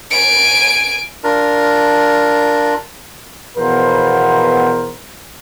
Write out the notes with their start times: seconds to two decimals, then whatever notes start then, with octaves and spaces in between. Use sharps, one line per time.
0.11 G#5 D7
1.24 D4 F4 A#4
3.57 E2 B2 F3 B3 A#4 C5